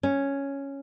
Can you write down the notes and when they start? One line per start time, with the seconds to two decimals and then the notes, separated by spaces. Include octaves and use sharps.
0.03 C#4